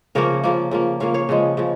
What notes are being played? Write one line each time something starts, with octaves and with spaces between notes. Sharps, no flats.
C#3 F3 A#3 A#4 C#5
C#3 F3 A#3
C#3 F3 A#3
C#3 F3 A#3 C#5 F5
C#5 F5
C#3 F3 G#3
C#3 F3